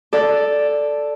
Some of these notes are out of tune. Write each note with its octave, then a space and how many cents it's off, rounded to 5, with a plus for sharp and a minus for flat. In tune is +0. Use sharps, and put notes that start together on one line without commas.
A4 +0 D5 +0